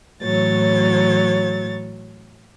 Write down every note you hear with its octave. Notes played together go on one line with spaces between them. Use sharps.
A2 E3 F#3 C#5 A6